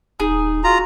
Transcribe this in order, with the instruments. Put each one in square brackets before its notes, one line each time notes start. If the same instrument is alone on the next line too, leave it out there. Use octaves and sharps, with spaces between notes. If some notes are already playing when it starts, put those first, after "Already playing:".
[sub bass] D#1 [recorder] D#4 [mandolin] G#4
[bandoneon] F4 A#5 [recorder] F#4